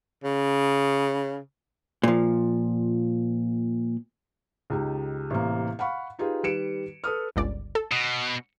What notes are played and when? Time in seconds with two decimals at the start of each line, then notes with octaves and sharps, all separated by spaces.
0.24 C#3
2.03 A#2 F3
4.70 C#2 D#4 G4
5.30 A1 C3 E3 A#3
5.79 F5 F#5 B5 C#6
6.19 D#4 F4 G4 G#4 B4
6.43 D#3 G3 B4 C#7 D7 E7
7.04 A4 B4 D#6 F6
7.36 G1 C#2 D5
7.75 A4
7.92 B2 D#6